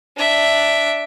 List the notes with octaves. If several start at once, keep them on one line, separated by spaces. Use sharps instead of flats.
D4 E5